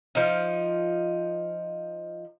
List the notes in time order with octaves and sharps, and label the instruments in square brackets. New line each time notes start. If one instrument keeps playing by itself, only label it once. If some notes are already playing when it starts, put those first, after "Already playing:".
[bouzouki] F3 D#4